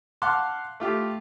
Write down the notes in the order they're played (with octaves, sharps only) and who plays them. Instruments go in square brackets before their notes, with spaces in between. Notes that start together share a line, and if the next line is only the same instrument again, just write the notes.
[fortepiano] F5 F#5 A5 C6 D6 F#6
A3 F4 G4